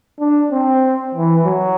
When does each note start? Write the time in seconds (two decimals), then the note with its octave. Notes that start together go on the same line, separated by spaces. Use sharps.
0.20 D4
0.51 C4
1.15 E3
1.45 F#3